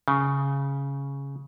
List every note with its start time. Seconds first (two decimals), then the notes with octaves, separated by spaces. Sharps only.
0.08 C#3